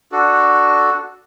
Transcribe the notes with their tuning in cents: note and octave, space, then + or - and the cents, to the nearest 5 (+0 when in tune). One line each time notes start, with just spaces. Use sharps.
D4 +0 F#4 +0 A4 +0